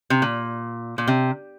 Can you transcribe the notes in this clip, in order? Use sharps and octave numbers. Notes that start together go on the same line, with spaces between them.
C3
A#2
A#2
C3